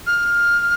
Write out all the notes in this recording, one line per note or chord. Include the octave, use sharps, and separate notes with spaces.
F6